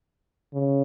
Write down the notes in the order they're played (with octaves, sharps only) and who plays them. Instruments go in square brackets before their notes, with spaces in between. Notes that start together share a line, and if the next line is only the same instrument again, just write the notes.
[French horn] C#3